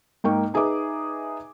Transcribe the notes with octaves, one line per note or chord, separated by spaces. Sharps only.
G#2 A#3 D#4 G5 C#6
D#4 G#4 B4 E5 D6